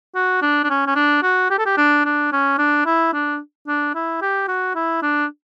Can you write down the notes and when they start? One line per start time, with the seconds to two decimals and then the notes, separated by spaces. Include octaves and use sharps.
0.15 F#4
0.42 D4
0.64 D4
0.70 C#4
0.87 C#4
0.96 D4
1.23 F#4
1.51 G4
1.58 A4
1.66 G4
1.77 D4
2.05 D4
2.32 C#4
2.58 D4
2.86 E4
3.13 D4
3.68 D4
3.95 E4
4.21 G4
4.48 F#4
4.75 E4
5.02 D4